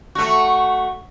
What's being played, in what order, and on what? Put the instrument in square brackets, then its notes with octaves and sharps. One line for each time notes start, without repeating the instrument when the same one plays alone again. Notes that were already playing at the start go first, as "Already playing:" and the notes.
[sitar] A3 F#4